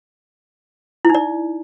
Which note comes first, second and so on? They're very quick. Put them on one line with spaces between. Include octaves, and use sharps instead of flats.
E4 D#4 D5